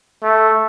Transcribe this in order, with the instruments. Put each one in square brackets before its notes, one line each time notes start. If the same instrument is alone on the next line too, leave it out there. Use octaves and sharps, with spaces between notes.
[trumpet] A3